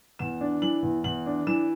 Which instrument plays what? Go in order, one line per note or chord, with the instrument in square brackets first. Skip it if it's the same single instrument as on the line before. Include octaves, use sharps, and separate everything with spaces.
[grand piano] E2 E7
D4
E3 F#7
E2
E2 F#7
D4
E3 E7